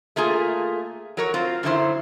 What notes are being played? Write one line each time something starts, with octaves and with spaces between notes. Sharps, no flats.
A3 A#3 F4 G#4
F#3 A#4 C#5
C4 F4 C5
F#2 D3 D#3 F#3 E4 C5